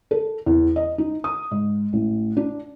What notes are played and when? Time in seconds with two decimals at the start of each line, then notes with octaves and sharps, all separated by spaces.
0.11 A4
0.46 E2
0.76 D#5
0.98 D#4
1.24 D#6
1.51 G#2
1.93 A1
2.37 D4